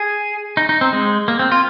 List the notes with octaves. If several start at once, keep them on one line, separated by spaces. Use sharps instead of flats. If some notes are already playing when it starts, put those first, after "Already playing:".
Already playing: G#4
D#4
D#4
C4
G#3
A#3
C4
F4